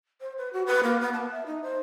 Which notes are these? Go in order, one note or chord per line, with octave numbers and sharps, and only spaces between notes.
C5
B4
F#4
B4
A#3
B3
A5
E5
D#4
C5